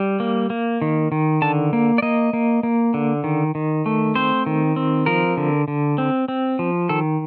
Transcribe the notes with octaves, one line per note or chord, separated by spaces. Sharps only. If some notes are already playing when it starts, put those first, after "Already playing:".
Already playing: G3
A#3
A#3
D#3
D#3
D3 A5
A#3
D5
A#3 D#5
A#3
A#3
D3
D#3
D#3
A3
C4 C5
D#3
C4
F3 A#4
D3
D3
C4
C4
F3
D#3 A4